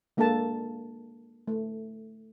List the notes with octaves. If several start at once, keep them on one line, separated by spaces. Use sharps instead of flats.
G#3 A#3 D4 A4 F5 A5
A3